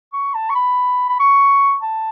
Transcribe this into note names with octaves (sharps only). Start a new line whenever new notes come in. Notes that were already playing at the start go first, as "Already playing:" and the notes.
C#6
A5
C#6
B5
B5
C#6
A5